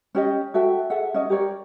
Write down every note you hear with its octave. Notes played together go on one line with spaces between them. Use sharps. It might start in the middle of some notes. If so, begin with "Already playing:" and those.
C#4 G4 D#5
F#4 A4 E5 G5
G#4 A4 E5 F#5
C#4 D#5
G4 A#4 C#5 D5